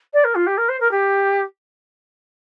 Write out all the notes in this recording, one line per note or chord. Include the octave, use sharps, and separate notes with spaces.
D5
A#4
F4
G4
A#4
C5
A#4
G4